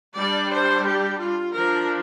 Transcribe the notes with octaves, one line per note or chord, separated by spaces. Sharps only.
G3 D4 D5
C5
G4
F4
F3 D4 A#4